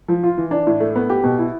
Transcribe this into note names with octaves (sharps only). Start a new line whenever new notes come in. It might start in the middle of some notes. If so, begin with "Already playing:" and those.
F3
F4
E3
D4
A2
A3
B3
G4
B2
E4